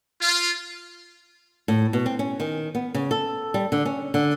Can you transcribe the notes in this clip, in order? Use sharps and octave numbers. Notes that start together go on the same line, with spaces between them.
F4
A2
B2
C4
C#4
D#3
B3
C#3
A4
G3
D3
C#4
D3